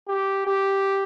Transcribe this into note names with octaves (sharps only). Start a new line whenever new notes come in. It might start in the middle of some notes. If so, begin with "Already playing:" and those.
G4
G4